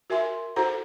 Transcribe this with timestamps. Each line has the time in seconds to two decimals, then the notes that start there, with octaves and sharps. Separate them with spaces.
0.10 F#4 A#4 E5 G#5 C6
0.56 E4 F#4 A4 C5 F#5 A#5